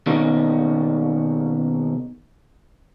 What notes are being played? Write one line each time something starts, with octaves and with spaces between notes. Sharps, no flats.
B2 D#3 A#3 C#4 D#4